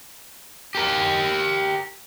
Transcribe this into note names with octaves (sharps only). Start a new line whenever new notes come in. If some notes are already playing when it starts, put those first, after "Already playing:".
G4 A#4